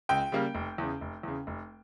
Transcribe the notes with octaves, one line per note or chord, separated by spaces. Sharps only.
C#2 G5
C#3 G3 A#3
F1
E2 C#3
F1
E2 C#3
F1